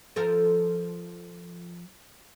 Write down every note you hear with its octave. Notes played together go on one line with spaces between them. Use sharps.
F3 A4 A#4